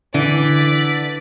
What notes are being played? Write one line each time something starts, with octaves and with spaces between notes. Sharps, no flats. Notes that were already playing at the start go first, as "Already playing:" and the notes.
D3 E3 D5 B6